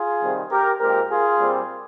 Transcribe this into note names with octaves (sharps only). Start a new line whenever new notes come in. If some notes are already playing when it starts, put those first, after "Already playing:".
Already playing: F4 G#4
C3 D#3 G3 C4
G4 A#4
A#2 G#3 C4 G4 A#4
F4 G#4
A#2 G3 C4